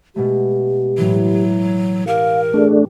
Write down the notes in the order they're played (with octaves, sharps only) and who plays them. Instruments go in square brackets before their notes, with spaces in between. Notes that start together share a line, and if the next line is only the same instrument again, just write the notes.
[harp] B2 G#3 A3 [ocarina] G4
[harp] A2 E3 [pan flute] F#3
[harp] G4 [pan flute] A#4 [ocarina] F5
[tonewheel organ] A3 D4 [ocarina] G#4